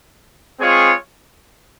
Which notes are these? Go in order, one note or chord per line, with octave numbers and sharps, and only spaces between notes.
G#3 C4 F4 G#4 C#5